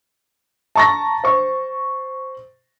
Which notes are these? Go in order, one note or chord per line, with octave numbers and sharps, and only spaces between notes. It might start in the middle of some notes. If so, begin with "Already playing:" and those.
A5 A#5 C#6 A6 A#6
C5 C#6